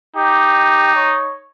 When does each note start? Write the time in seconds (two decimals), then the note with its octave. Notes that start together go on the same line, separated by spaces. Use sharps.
0.16 D#4 G4
0.95 C#5